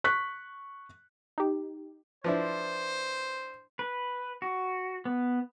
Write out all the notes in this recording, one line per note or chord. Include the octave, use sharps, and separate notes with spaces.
C#6 F#6 B6
D#4 G4
F3 D4 E4 B4 C5 E5
B4
F#4
B3